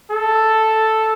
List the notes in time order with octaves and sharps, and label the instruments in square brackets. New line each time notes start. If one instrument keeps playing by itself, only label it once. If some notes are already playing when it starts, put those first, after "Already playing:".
[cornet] A4